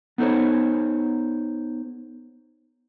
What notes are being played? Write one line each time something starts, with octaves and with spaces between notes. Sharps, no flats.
B3 D#4 A4 C5 C#5